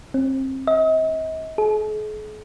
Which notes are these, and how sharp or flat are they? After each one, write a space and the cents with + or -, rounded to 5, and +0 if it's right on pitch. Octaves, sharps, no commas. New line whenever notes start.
C4 +25
D#5 +40
G#4 +45